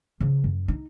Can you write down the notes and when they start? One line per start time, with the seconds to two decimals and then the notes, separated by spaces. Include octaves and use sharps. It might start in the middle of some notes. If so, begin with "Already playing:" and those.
0.20 C#3 F3
0.44 F#2
0.68 D#4